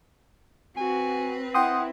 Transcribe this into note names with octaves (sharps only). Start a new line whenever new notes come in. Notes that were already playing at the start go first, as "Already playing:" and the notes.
C4 F#4 B4 G#5
E4 F#5 G5 C6 D#6